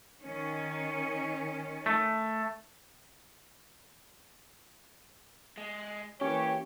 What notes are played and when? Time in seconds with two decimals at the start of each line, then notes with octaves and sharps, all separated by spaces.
0.24 D#3 C#4
1.86 A3
5.57 G#3
6.21 E3 A#3 C#4 G4 C#5